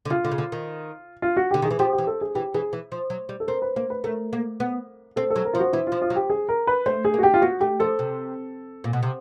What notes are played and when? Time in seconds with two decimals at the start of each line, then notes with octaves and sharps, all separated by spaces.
0.05 D3
0.10 C#3 F4
0.25 D3
0.31 C#3
0.38 D3
0.52 D#3
1.22 F4
1.37 F#4
1.51 D3 G4
1.62 D#3 G#4
1.70 E3
1.79 F3 G4
1.93 G4
1.98 E3
2.07 A4
2.21 G#4
2.35 E3 G4
2.54 E3 G#4
2.73 E3
2.92 F3
3.10 F#3
3.29 G3
3.40 A4
3.48 C4 A#4
3.62 B4
3.76 A#3 C5
3.90 B4
4.04 A3 A#4
4.33 A#3
4.60 B3
5.16 C4 A4
5.30 A4
5.36 F#3
5.45 A#4
5.53 F3 F4
5.59 F#4
5.73 E3 E4
5.87 F3 F4
6.02 F4
6.10 F#3
6.16 G4
6.30 G#4
6.49 A#4
6.67 B4
6.86 A3 C5
7.05 G#4
7.14 A#3
7.18 F#4
7.23 G4
7.34 F4
7.42 B3 F#4
7.60 A3 G4
7.80 F3 A4
7.99 C3
8.84 A#2
8.93 B2
9.03 C3